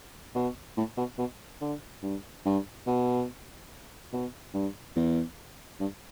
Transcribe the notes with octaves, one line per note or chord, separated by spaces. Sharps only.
B2
A2
B2
B2
D3
G2
G2
B2
B2
G2
E2
G2